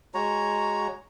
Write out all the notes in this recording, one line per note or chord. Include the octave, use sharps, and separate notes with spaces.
G#3 F#4 C#5 A#5